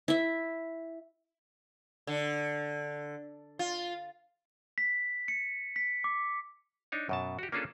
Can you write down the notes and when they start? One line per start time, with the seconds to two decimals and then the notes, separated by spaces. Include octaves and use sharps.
0.08 E4 E5
2.07 D3
3.59 F4
4.78 B6
5.28 C#7
5.76 B6
6.04 D6
6.92 D4 D#4 C#5
7.09 F#2 B2 A5
7.39 F#4 G4
7.52 A#3 C#4 D4 F4 G#4 A4